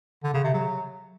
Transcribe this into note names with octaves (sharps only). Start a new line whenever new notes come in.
D3
C#3
C3
F#3